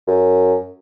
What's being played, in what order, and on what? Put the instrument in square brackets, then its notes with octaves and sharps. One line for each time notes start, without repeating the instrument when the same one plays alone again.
[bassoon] F#2